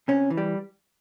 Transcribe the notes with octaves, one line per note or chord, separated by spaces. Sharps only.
C3 C#4
E3
G3